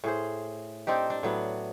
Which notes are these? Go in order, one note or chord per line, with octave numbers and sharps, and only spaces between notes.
A2 G#4 C5
C4 D4 D#4 G4
D4
A2 F#3 B3